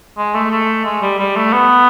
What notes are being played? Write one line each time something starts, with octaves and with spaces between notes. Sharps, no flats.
G#3
A3
A3
G#3
G3
G3
A3
B3